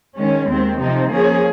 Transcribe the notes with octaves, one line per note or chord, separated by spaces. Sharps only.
D#3 G#3 C#4
D#2 D#3 G#3 C4
C3 F3 C4 D#4
F3 A#3 C#4 G#4